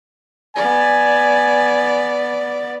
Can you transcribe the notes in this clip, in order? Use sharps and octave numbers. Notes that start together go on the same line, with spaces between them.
B3 D5 G#5